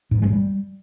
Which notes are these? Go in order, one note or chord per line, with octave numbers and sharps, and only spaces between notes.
G#2
G2
G#3
G2
G3